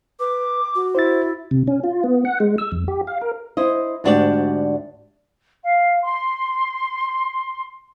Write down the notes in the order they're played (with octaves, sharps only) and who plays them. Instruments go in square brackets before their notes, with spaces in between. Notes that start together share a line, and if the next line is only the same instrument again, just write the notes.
[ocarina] B4 [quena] D6
[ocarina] F#4
[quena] E4 [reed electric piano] C5 A6
[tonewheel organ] C3
C#4
F4
B3
F#5
G#3
E6
F2
G4
F5
A#4
[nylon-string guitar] E4 C5 D#5
D2 G#2 D4 F#4 G4 D5
[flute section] F5
C6